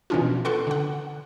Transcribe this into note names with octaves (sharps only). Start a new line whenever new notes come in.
B2 E3 F3 C#4 D4 F4
A4 B4 F#5 C6 C#6
D3 F#5